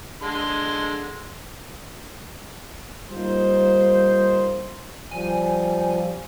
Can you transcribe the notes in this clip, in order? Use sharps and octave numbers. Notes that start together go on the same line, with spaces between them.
D3 G#3 C6
G3 A#3 D#4 F4 C5
F3 G3 G#5